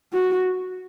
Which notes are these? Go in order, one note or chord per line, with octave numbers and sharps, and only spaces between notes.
F#4